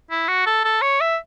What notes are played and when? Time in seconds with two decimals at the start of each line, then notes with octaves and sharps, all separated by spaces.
0.11 E4
0.28 F#4
0.46 A4
0.64 A4
0.82 C#5
1.01 E5